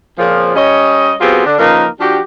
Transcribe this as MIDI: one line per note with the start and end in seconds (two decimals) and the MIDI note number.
0.19 0.54 41
0.19 0.54 46
0.19 0.54 49
0.19 0.54 53
0.55 1.14 55
0.55 1.14 61
0.55 1.14 73
0.55 1.14 75
1.21 1.43 54
1.21 1.43 59
1.21 1.43 60
1.21 1.43 65
1.21 1.43 67
1.21 1.43 68
1.46 1.56 50
1.46 1.56 62
1.58 1.87 49
1.58 1.87 53
1.58 1.87 58
1.58 1.87 63
1.58 1.87 70
1.58 1.87 71
2.01 2.20 53
2.01 2.20 62
2.01 2.20 66
2.01 2.20 67